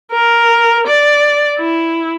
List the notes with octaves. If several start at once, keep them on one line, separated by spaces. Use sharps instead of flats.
A#4
D5
E4